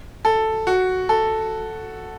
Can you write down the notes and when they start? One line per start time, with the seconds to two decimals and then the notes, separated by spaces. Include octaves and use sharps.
0.25 A4
0.67 F#4
1.09 A4